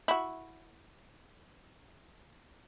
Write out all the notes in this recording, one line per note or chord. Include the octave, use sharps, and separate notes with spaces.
E4 F#4